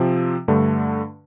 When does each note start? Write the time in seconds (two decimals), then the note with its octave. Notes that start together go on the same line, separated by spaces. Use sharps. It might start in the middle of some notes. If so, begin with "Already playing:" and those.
Already playing: C3 F3 C4
0.48 G2 D3 A3